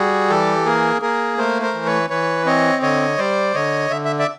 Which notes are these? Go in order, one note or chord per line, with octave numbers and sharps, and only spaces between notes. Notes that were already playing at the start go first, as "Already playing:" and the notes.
Already playing: G3 F#4 G#4
E3 G4 A4
A#3 G#4 A#4
A#3 G#4 A#4
A3 A#4 C5
A#4 C5
E3
B4 C#5
E3 B4 C#5
C4 C#5 D#5
D3 C#5 D#5
G3 C5 D5
D3 C#5 D#5
D3 E5
E5
D5 E5